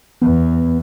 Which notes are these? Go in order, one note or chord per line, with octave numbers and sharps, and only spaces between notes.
E2 B3